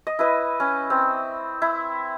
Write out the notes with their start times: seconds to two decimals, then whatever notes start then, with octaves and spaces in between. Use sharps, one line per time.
0.07 D#5
0.19 E4 B4 D#5
0.60 C#4
0.90 C4
1.62 E4